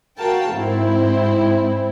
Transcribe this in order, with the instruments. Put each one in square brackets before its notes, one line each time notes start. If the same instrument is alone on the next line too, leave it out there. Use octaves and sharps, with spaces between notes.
[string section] F#4 A#4 F5 G5 A5
G#2 C4 E4